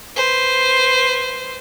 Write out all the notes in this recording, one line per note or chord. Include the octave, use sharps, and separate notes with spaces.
B4 C5